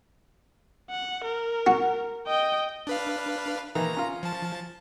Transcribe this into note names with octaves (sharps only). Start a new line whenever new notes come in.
F#5
A#4
F#4
D#5 G5
D4 B4 F5
D#3 E3 A#3 A#5
C#4 F4
F3 A5